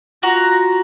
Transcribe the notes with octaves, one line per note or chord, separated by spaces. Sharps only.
F4 F#4 A#5